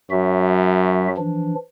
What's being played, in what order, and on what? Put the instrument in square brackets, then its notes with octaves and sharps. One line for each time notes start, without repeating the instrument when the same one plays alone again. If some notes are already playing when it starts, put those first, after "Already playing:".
[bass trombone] F#2 [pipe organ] F#3 F#4 E5
[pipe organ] E3 F3 D4